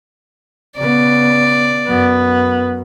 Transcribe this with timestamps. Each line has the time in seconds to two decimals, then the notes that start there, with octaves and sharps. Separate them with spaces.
0.77 C#3 B3 D5
1.88 F#2 B3